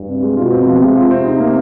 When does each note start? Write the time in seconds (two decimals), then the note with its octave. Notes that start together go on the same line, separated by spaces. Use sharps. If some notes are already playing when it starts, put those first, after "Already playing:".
Already playing: G2
0.08 C3
0.23 G#3
0.37 B2 F4
0.52 C4
0.67 F3
0.81 C3 G#3
0.96 F4
1.11 C4
1.25 D#4
1.40 A#3